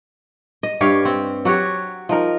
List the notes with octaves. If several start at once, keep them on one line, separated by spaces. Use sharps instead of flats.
D#5
G2 G4 C#5 F5
C4
F#3 F#4 G4 C#5
F3 D#4 A#4